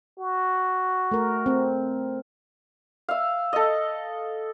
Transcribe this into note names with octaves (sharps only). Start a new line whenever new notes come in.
F#4
A3 A#4
C4
E5 F5
A4 D#5